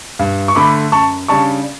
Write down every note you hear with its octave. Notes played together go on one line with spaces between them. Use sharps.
G2
C#6
D3 A3 B5 D6
F#2 A5 C#6
C#3 G3 D4 A5 C#6